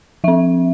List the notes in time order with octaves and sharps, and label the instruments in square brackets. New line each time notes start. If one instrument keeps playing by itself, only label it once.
[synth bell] F3 C4 E5